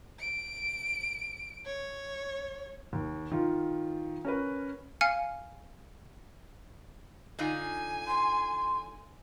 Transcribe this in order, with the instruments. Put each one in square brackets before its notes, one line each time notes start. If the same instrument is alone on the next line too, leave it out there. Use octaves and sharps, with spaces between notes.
[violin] D7
C#5
[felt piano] D#2
D#3 F4
C#4 A#4 B4
[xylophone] F5 G#5 F6 C#7
[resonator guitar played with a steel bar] D3 D#4 F4 [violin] G#5
[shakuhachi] C6